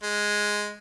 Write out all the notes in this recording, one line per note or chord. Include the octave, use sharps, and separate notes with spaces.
G#3